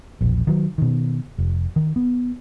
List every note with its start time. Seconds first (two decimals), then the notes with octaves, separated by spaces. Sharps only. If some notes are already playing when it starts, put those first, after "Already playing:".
0.21 E1 A#1
0.47 D#3 F#3
0.78 B2 D#3
1.38 F1
1.76 D#3
1.96 B3